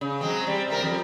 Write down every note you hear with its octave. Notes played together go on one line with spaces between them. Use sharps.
C#3
F#3 G#3 C4
G3 C4
C3 C4 A#4
F2 G3